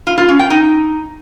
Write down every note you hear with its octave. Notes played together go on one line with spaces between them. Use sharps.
F4
F4
C#4
G5
D#4